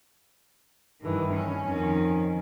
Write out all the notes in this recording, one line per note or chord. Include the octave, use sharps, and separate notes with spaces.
G2 D#3 E3
C#4
F2 D#3